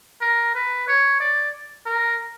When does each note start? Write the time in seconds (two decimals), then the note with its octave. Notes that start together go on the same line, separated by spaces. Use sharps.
0.21 A#4
0.54 B4
0.88 C#5
1.20 D5
1.86 A#4